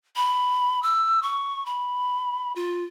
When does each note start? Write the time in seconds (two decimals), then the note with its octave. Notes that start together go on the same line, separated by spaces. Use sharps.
0.16 B5
0.83 E6
1.23 C#6
1.66 B5
2.56 F4